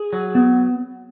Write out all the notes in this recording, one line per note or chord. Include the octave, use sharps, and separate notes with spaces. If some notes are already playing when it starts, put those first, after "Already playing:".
Already playing: G#4
F#3
B3